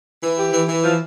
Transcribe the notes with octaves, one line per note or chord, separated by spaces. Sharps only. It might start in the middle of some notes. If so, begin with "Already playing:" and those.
E3
G4
E3
E3
F3